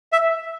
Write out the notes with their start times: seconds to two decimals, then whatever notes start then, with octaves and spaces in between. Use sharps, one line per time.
0.12 E5